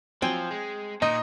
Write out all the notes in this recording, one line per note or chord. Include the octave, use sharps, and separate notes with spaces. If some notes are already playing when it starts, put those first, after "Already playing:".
F3 F#3 C4 C5 G5 G#5
G#3
A#2 D#4 D#5